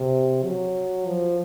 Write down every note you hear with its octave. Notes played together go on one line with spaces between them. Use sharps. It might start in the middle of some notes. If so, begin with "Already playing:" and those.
Already playing: C3
F#3
F3